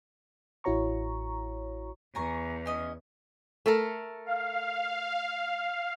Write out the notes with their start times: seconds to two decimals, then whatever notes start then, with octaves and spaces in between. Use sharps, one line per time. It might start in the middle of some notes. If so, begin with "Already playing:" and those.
0.64 A1 E4 F#4 C#5 A#5 C#6
2.15 E2 G#5 A#5 C#6
2.66 C#4 D#5 G#5
3.66 A3 A4 A#4
4.26 F5